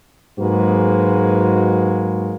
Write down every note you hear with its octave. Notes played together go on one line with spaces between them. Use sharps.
G#2 F#3 G#3 A#3 F#4 B4